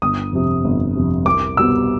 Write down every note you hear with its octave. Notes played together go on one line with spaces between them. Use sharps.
G1 D#6
F2 C3
G1
F2 C3
C2 D6
B2 G3 B3 E6